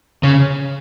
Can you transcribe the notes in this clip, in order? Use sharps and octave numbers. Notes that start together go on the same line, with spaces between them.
C#3